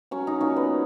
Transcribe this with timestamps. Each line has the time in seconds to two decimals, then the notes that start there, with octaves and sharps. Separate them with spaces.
0.11 F#3 C#4
0.27 D#4
0.41 A#2 C#4
0.56 B3